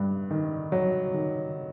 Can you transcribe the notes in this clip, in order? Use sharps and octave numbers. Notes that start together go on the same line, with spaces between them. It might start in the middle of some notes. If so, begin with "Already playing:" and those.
Already playing: G2
D#3
F#3
D#3